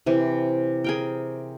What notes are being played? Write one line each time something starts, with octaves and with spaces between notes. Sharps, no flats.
C3 E3
G#4 A#4 G5